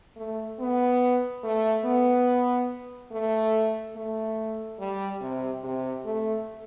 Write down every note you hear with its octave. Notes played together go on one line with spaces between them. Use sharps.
A3
B3
A3
B3
A3
A3
G3
C3
C3
A3